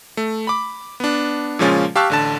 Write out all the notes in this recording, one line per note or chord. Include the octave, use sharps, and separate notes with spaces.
A3
B5 D6
B3 D4
A#2 C#3 F3 G#3 C#4 F4
G4 F5 A5 C#6 E6 F#6
A1 D3 A5